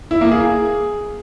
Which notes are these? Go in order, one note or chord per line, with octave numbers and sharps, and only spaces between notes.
E4
A#3
G#4